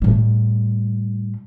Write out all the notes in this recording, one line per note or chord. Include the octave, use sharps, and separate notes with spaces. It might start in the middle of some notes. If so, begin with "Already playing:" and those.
A2 G3